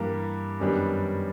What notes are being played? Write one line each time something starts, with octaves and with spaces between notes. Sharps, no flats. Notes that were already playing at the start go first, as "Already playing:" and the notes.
Already playing: G2 E3 G3 A#3 A#4
F#2 D#3 G3 B3 D4